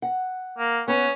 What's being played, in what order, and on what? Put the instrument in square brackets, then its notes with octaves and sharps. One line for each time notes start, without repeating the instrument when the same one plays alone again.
[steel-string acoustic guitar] F#5
[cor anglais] A#3
[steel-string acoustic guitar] B3 A#5 [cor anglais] C#4